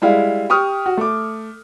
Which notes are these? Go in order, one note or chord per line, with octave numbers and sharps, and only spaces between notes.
G3 G#3 E4 F5
G4 C#6 D#6 F6
F#4
A3 D6